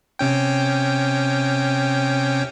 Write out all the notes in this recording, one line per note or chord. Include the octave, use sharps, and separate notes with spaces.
C3 C#4 G5